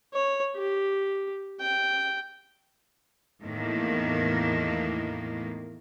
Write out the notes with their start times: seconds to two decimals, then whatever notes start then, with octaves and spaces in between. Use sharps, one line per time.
0.13 C#5
0.55 G4
1.60 G5
3.42 E2 A2 D#3 A#3